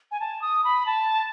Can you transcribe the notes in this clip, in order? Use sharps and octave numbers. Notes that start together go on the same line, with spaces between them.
G#5
A5
D#6
B5
A5